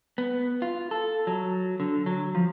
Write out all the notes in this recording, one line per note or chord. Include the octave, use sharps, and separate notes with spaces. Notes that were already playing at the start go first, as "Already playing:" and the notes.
B3
F4
A4
F#3
D3
F#3
F3